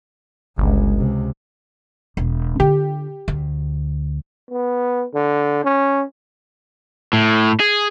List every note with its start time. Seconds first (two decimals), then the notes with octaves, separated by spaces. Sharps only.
0.58 G1 C#2 G#3
0.97 C#2 C3
2.17 E1
2.60 D3 F4 G4
3.28 D2
4.50 B3
5.14 D3
5.64 C#4
7.13 A2
7.60 G#4